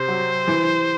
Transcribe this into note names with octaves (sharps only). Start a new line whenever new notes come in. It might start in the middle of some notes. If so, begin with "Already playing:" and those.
Already playing: C3 C5
F#3
E3